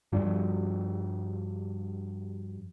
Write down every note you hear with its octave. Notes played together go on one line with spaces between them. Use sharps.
G2 F3 D4